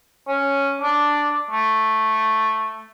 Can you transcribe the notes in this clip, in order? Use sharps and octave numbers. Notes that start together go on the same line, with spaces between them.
C#4
D4
A3